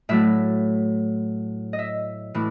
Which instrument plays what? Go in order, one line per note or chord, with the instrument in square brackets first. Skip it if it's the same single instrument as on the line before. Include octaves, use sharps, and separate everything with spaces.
[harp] A2 F#3 A3 E5
D#5
E5
A2 E3